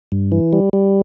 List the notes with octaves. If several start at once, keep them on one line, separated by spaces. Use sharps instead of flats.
G2
E3
G3
G3